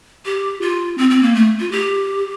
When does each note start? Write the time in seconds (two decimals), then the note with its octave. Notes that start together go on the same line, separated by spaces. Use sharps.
0.25 G4
0.61 F4
0.98 C4
1.10 C4
1.23 A#3
1.35 A3
1.60 F4
1.72 G4